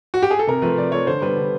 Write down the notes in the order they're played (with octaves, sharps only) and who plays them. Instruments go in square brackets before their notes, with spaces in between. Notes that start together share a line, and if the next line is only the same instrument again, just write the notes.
[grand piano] F#4
G4
G#4
A4
C3 A#4
F3 A3 B4
C3 D5
F3 A3 C#5
D3 C5
G3 B3 B4
D3